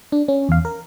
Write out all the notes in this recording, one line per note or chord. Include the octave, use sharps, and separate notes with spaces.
D4
C#4
E2 F5
A#4